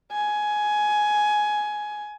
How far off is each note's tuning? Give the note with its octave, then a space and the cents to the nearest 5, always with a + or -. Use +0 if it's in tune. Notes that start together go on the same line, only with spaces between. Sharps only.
G#5 +15